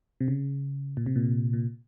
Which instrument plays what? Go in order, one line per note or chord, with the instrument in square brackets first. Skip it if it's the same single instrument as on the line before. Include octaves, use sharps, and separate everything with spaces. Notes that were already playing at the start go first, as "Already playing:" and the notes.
[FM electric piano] C3
C#3
A#2
C3
A#2
A#2